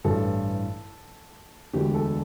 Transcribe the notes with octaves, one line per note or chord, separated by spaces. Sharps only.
A1 G2 E3 A4
E1 D2 D3 G4
A4